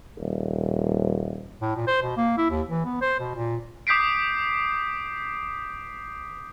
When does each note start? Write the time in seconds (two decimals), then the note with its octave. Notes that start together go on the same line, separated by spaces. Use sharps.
0.17 D#1
1.61 A2
1.76 A#2
1.87 C5
2.02 B2
2.17 A#3
2.38 E4
2.50 D#2
2.69 E3
2.85 B3
3.01 C5
3.20 B2
3.35 A#2
3.87 D6 D#6 G6 B6 C7 D7